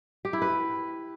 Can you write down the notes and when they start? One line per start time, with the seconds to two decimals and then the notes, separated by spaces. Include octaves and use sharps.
0.25 G4
0.33 E4
0.42 B4